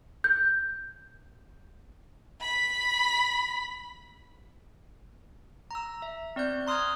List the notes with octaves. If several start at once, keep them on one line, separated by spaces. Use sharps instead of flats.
G6
B5 B6
A#5 E6
E5
C4 D5 F#6 G6
A#5 C6 D#6 F6 F#6 G#6